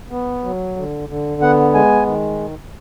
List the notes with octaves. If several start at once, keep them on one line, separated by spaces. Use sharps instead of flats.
B3
F#3
D3
D3
B3 F#5
G#3 G#5
D#3